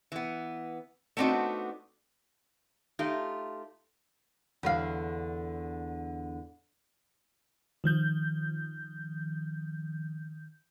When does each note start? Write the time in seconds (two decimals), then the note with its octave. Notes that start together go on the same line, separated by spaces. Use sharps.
0.12 E3 B3
1.17 A3 B3 C4 D4 D#4 F#4
2.99 A3 D#4 F4 G4
4.63 E2 D3 F5
7.84 D#3 F3 G6